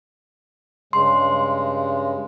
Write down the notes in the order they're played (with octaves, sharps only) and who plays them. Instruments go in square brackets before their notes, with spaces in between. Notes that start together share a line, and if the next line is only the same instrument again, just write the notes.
[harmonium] G2 C#3 G#3 [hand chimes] C6